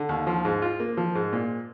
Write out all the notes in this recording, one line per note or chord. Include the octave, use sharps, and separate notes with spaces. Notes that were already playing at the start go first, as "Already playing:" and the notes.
Already playing: D3
D#2
F3
G#2
F4
A#3
F3
G#2
A#2